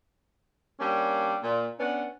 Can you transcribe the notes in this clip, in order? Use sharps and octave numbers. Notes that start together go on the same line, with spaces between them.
G3 A#3 C#4 D4
A#2
B3 C#4 D4 F#5